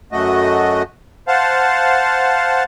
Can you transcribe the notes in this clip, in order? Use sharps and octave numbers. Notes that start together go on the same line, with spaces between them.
F#2 A3 F#4 D#5
C5 F5 F#5 A5